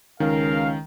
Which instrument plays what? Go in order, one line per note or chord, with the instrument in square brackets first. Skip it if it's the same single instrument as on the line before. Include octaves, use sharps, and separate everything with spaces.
[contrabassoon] C#2 [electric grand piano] D#3 [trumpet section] A#4 F5